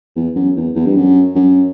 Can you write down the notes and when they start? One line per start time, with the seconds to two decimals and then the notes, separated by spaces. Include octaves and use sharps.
0.16 E2
0.36 F#2
0.56 E2
0.75 E2
0.86 G2
0.96 F#2
1.35 F#2